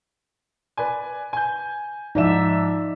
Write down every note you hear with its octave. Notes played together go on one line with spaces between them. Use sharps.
B4 D5 G#5
G#5 G6
G#2 F3 D#4 D5 E5 E7